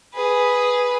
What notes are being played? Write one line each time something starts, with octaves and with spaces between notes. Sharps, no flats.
G#4 B4